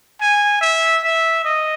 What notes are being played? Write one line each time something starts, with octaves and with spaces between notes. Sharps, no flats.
G#5
E5
E5
D#5